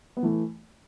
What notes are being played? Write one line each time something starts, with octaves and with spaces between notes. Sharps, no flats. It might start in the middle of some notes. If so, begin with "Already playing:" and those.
B3
E3 A3